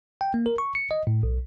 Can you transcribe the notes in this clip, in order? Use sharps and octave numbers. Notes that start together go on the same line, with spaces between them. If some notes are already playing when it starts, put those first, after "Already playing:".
G5
A#3
A#4
C#6
C#7
D#5
A2
B1